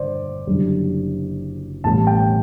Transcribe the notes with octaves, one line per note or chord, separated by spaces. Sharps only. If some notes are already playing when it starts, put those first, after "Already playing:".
Already playing: G1 C5 D5
F#1 F#2 D3 G3
A1 A2 G3 B3 A5
G5